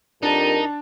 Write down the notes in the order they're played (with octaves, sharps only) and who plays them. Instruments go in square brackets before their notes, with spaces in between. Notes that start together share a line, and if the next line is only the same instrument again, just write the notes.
[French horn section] F2 G4 A#4 [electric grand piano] D4 A5 [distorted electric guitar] D#4